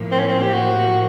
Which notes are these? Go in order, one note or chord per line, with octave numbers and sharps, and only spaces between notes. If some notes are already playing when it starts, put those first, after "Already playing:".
Already playing: A2 F3 A#3
C4
C#4
C4
G4
F#4